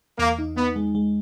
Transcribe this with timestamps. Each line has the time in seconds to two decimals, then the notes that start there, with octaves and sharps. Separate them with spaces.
0.18 E2 A#3
0.38 D#4
0.57 B3 D#4
0.76 G#3
0.95 G#3